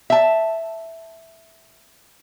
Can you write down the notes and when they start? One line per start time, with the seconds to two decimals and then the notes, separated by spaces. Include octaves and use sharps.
0.10 E5 A5